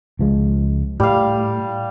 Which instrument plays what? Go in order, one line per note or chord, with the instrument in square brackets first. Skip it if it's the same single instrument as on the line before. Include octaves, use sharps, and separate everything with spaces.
[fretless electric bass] C#2 F3 G#3
[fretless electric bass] A2 [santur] G3 F5